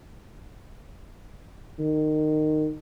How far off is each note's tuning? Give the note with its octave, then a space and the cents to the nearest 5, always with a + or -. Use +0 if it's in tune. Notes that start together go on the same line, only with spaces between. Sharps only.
D#3 -20